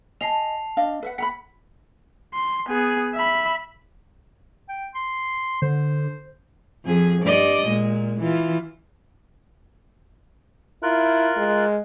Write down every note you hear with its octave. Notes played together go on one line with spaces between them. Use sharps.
D#5 G#5 A5 C7 F7
D4 D#5 F5
B4 E5 F#5
F#5 A#5 B5 B6
C6
B3 G#4
E5 B5
G5
C6
D3 C5
F2 G#4
G2 D5 D#5
A#2 G#3
E3 F4
E4 F4 A#4 F#6
G#3